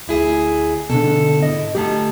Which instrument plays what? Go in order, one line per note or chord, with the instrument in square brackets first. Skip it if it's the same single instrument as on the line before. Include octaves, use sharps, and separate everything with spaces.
[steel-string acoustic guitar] D2 E4 G#4
[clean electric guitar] B2 D3 [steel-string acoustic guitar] A4
[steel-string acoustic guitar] G#2 E4 [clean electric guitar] D#5
[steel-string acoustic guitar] D3 A3 [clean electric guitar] G4 A4 A5